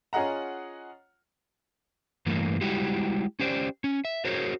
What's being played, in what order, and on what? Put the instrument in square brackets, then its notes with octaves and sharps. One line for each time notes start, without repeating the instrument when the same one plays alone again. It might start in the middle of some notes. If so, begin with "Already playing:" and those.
[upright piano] C#4 F4 G#4 D#5 F#5 A#5
[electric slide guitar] G2 E3 A3 A#3
G3 G#3 E4 F#4 G4
C#4 G4 C5 D5
C#4
E5
F#4 G#4 A#4 C5 C#5